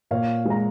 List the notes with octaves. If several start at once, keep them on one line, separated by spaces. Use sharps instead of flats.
A#2 C#5 F5
G#3
A#5